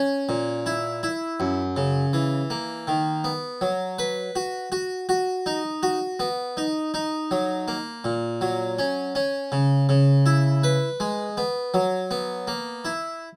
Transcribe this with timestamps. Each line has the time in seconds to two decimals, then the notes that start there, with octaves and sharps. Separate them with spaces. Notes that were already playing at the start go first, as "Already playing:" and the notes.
Already playing: C#4
0.29 A#2
0.66 E4
1.03 E4
1.40 F#2
1.76 C#3
2.13 E3
2.50 A#3
2.87 D#3
3.24 B3
3.61 F#3
3.99 B4
4.36 F#4
4.72 F#4
5.09 F#4
5.46 D#4
5.83 F#4
6.20 B3
6.57 D#4
6.94 D#4
7.31 F#3
7.68 A#3
8.04 A#2
8.41 F#3
8.79 C#4
9.15 C#4
9.52 C#3
9.89 C#3
10.26 E4
10.63 B4
11.00 G#3
11.37 B3
11.74 F#3
12.11 B3
12.47 A#3
12.85 E4